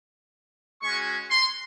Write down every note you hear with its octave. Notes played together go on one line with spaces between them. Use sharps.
G#3 C#4 F#4 C#6
C6